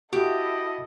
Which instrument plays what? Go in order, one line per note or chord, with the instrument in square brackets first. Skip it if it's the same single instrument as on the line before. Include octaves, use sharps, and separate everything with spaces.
[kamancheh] E4 A4 [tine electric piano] F#4 [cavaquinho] G4 [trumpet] D#5